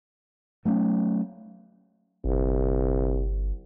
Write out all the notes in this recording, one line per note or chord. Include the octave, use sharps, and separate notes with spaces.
F#3 A3 B3 C#4
G1 C2